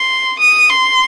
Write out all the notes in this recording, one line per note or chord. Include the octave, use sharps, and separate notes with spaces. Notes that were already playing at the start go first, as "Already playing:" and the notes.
Already playing: C6
D#6
C6